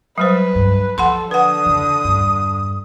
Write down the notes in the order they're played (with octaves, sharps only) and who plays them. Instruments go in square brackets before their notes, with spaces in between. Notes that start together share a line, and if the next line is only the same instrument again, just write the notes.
[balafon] F#3 G3 C5 [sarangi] B4
[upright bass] G2
[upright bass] F3 [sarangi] A4 [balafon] F#5 B5 C6
[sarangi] D3 [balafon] B4 F#5 [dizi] D#6
[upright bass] E2 C#3
E2 G2